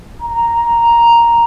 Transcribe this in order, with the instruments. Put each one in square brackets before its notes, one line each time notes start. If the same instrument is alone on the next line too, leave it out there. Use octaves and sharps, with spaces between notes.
[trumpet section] A#5